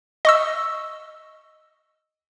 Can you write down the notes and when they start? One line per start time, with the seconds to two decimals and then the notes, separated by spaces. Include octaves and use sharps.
0.25 D#5 C#6 E6